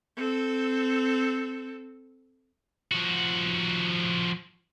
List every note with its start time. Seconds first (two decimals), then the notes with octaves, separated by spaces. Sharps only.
0.16 C4 A4
2.92 F3 F#4